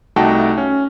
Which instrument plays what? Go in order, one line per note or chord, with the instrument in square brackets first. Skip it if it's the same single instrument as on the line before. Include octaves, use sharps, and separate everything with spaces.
[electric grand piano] C2 A3 D#4 F#4 G5 A5
C#4